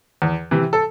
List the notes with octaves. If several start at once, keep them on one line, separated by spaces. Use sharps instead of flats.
E2
C3 E3
A4